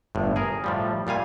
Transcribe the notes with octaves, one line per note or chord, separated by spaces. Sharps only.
G1 A2
G#4 A#4
A2 F3 G3
A#2 G3 F5 G#5